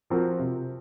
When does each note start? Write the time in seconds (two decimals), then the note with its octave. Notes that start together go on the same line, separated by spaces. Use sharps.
0.10 F3 C4 F#4 A#4
0.39 C3